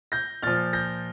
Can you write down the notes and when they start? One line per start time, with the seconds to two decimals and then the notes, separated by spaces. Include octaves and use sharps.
0.12 G6 A#6
0.43 A#2 F3 F6 A6
0.73 G6 A#6